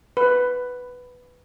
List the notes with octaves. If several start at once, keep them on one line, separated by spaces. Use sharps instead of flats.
B4